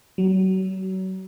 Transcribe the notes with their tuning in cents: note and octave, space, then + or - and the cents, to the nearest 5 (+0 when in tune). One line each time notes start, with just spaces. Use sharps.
F#3 +35